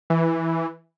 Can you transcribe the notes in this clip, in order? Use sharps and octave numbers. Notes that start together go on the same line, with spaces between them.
E3